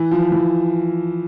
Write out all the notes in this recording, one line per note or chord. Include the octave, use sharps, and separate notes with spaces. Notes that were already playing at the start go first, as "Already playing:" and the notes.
Already playing: E3
F3
E3